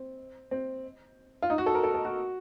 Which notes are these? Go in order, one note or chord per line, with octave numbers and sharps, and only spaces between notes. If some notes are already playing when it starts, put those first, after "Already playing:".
Already playing: C4
C4
F4
D#4
F#4
A4
A#4
A4
A4
F#4